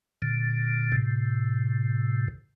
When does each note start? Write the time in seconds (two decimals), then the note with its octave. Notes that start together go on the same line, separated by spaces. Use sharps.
0.22 A#2 D3
0.92 A2 C3